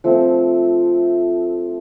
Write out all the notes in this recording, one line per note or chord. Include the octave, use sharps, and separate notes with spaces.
F3 A3 C4